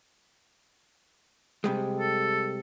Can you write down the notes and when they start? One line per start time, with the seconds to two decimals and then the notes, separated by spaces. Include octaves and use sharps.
1.64 C3 G3 G#3
1.98 A4